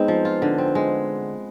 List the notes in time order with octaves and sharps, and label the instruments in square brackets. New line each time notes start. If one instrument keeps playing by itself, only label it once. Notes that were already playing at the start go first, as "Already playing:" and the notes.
Already playing: [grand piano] G#3 B3 D#4 G#4 B4 D#5 [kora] C4
[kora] F3
F4
D3
C4
G#3